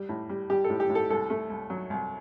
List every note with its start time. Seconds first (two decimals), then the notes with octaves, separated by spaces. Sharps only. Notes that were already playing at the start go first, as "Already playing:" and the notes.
Already playing: G3
0.09 A2
0.29 G3
0.50 G3 G4
0.64 A4
0.70 A2
0.80 G4
0.89 A2
0.95 A4
1.10 C2 A4
1.30 A3
1.50 C2
1.70 F#3
1.90 C2